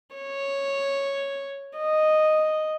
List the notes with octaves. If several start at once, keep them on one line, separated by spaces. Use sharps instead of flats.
C#5
D#5